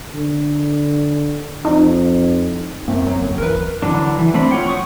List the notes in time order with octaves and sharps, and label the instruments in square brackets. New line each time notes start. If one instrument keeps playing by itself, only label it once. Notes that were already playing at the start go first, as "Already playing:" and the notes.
[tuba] D3
[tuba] F2 [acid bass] D#4
[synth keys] F#2 A3 [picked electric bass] A#3 C4
[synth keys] F#2 F#3
[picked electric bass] E1 D2
[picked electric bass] G1 D#2 E3 [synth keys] A#4 B4
[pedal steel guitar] D3 E3 F#3 D4
E3
A3 C4 D4 B5
F4 C#5 F#5 G5
F#3 C#6 D#6